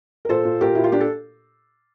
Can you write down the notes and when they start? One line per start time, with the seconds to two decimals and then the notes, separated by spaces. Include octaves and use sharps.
0.25 A#4
0.29 A#2 A4 C5
0.45 A#2
0.61 A#2 G4 A#4
0.75 A#2 E4
0.84 F4
0.92 D4 G4
1.00 A4